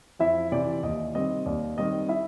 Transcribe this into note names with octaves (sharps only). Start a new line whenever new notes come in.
F2 E4 E5
C3 E3 D5
D#2 D#5
D#3 G3 C4 D#5
D#2 D5
D#3 G3 C4 D#5
E4 E5